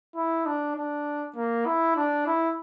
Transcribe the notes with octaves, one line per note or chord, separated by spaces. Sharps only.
E4
D4
D4
A#3
E4
D4
E4